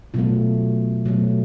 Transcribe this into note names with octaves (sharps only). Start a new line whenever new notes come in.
B2 F#3 A3 F4
B2 F#3 A3